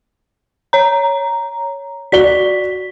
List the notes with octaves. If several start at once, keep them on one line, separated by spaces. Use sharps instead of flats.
C#5 A#5
F#4 D5 B6 G7